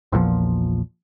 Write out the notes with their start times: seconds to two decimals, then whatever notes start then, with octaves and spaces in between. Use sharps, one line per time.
0.12 A#1 E2 A#2 F3